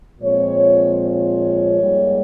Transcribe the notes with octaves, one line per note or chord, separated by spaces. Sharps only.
A#2 F3 G#3 C4 C#5
C#5
G#2 G3 A#3